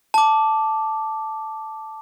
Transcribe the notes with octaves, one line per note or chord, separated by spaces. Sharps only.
A5 D6